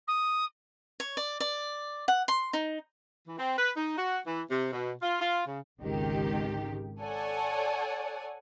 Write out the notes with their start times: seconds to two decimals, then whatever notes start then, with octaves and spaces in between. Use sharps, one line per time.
0.07 D#6
1.00 C#5
1.17 D5
1.40 D5
2.08 F#5
2.28 C6
2.53 D#4
3.27 E3
3.39 C4
3.58 B4
3.76 D#4
3.98 F#4
4.26 E3
4.49 C3
4.72 B2
5.02 F4
5.21 F4
5.47 C#3
5.83 G#1 C#2 D#3 G4
7.02 A4 C#5 D5 F#5 G#5